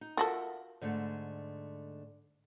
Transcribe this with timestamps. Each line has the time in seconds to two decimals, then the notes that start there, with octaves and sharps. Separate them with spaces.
0.01 D#4
0.17 F4 F#4 A4 A#4 E5 F#5
0.81 G#2 D3 A3